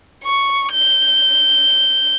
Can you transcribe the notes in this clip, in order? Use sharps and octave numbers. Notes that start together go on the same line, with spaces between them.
C#6
G6